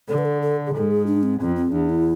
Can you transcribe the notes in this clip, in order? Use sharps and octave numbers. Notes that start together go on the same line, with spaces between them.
D3 A4
B4
A4
A4
G#4
G#2 A4
G#4
D4
C4
F2 C4
C4
E2 D4
E4